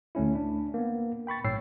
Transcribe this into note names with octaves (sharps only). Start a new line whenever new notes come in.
D2 A3 C#4 E4
D4
A#3 B3
G5 B5 C#6 A6
A#1 G#2 C#5 G5 E6 C7